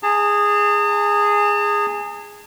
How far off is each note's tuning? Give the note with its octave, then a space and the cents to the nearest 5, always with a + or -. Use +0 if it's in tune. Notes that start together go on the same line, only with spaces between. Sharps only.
G#4 -10 A5 +40